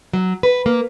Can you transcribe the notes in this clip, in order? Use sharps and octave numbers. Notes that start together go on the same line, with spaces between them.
F#3
B4
A#3